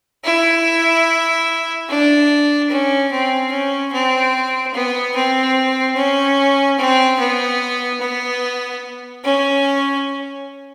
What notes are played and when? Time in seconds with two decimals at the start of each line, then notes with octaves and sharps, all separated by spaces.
0.24 E4
1.88 D4
2.70 C#4
3.11 C4
3.51 C#4
3.92 C4
4.74 B3
5.15 C4
5.96 C#4
6.78 C4
7.19 B3
8.01 B3
9.24 C#4